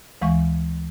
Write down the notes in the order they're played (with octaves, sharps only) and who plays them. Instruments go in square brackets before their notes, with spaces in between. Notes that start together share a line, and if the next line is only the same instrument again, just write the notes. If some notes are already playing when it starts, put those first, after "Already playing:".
[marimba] D2 E3 G#3 F5 C#6